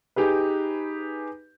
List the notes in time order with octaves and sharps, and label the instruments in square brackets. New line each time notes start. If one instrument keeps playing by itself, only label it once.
[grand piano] D#4 G4 G#4 B4